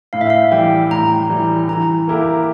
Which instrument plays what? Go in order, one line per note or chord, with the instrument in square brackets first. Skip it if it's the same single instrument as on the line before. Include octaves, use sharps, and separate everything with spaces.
[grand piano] A2 [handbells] F5
[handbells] E5
F5
[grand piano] E3 G3 [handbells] G5
[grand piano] A2 [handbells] A#5
[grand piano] E3 G3
[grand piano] E3 [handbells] A#5
[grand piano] A#3 E4 G4 A#4